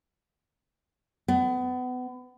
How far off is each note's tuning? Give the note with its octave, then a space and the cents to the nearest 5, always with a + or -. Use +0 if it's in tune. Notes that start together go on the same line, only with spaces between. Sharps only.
B3 +30